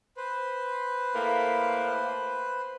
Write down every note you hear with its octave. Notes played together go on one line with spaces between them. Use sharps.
B4 C5
A2 A#3